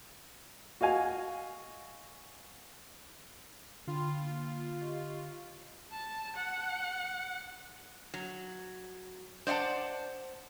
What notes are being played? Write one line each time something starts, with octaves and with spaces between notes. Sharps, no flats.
F#4 D#5 F5 G#5
D3 F4 G5 B5 C6
A#3
G4 D#5 C#6
A5
F#5
F#3
C5 D5 F5 F#5 A5